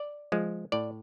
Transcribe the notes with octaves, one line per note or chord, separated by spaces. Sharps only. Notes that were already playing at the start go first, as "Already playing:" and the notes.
Already playing: D5
F3 G#3
A2 D5